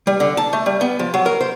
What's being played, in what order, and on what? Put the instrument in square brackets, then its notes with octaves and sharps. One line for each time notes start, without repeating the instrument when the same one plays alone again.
[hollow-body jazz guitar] G3
D3
A5
A3
G3
B3
F3
F#3
A#4
C5